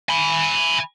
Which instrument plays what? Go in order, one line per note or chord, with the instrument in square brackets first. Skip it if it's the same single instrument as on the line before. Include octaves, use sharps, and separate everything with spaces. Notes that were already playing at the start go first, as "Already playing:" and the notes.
[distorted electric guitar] G#5 B5